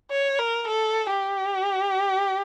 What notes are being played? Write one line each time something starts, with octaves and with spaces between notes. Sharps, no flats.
C#5
A#4
A4
G4